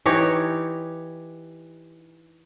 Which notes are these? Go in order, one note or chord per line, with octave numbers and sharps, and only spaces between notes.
E3 D#4 G4 C#5